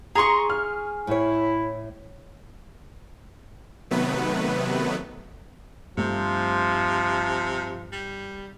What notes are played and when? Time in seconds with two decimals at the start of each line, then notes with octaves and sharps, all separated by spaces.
0.15 G#4 A#5 C6 C#6
0.50 F6
1.07 A2 E4 C#5
3.91 C3 D#3 F#3 A3 B3 B4
5.97 G2 C3 F3 A3
7.92 G3